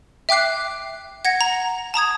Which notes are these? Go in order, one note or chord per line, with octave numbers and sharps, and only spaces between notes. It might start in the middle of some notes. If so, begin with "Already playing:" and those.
E5 G5 D6 F#6 C7
F#5 G#6 A#6 C#7
A#5
A5 A#5 D#6 G#6